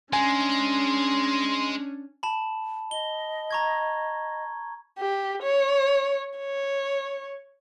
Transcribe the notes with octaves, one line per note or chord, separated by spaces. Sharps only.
G#3 C#4 D4 G#5 C6
A5 B5
D#5 G7
A#5 C#6 G#6
G4
C#5
C#5